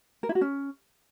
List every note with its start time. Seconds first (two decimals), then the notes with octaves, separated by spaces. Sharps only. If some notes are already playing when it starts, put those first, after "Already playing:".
0.23 A#4
0.29 E4
0.35 F#4
0.41 C#4